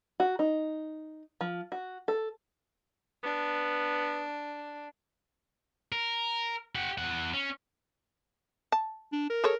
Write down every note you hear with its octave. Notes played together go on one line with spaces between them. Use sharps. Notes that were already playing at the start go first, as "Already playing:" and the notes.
F#4
D#4
F3
F#4
A4
B3 D4
A#4
G4 F#5
E2 F#5
C#4
A5
D4
A#4
G#4 A4 C#5